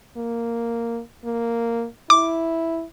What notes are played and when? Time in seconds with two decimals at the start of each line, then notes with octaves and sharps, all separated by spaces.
0.17 A#3
1.25 A#3
2.10 E4 D6